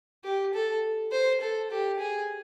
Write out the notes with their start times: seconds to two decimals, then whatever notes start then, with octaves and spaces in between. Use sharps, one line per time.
0.24 G4
0.54 A4
1.12 C5
1.41 A4
1.71 G4
1.99 G#4